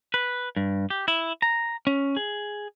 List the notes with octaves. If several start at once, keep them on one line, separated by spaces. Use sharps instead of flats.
B4
G2
G4
E4
A#5
C#4
G#4